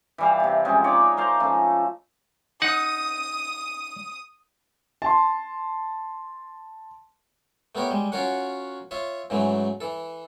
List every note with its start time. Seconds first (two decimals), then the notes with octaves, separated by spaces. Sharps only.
0.18 E3 G3 F5
0.40 C3 A5
0.65 F3 G#3 C4 C#4
0.84 D#4 C#5 D5 D6
1.17 A#4 C5 F5 A5
1.40 F3 A3 C#4
2.62 D#4 F#5 D#6
5.02 A5 C6
7.75 A3 B3 G4 A#4 C#5
7.91 G3 G#3
8.12 C#4 F4 F#4 A#4 C#5 F#5
8.91 F4 C#5 E5
9.30 G#2 C#3 E3 F#3 A3
9.80 E3 A4